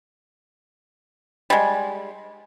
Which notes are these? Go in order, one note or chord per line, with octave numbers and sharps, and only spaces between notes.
G3 G#3